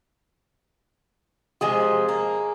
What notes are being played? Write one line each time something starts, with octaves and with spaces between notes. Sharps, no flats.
C3 F3 G#3 G#4
A#3